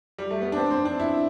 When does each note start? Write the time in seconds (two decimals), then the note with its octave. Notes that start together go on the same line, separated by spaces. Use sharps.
0.18 G3
0.31 A3
0.41 B3
0.52 D4
0.56 C4
0.71 C4
0.85 D4
1.00 E4